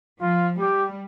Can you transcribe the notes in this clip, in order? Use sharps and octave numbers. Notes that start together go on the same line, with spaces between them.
F3 F4
G3 G4